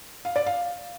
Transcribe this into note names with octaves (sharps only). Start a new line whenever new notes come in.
F5
D5
F5